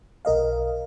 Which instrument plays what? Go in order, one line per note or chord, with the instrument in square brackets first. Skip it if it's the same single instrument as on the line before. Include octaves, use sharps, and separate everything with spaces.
[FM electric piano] B1 A#4 D#5 F5